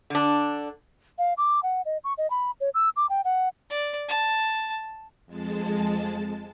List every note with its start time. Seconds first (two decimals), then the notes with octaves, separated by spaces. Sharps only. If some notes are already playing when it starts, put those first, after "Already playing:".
0.10 D3 D4
1.18 F5
1.37 D6
1.63 F#5
1.85 D#5
2.04 C#6
2.18 D#5
2.30 B5
2.60 C#5
2.74 E6
2.96 D6
3.09 G5
3.25 F#5
3.70 D5
4.08 A5
5.26 F2 G#3 A5